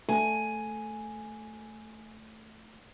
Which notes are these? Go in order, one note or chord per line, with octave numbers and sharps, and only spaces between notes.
A3 G#5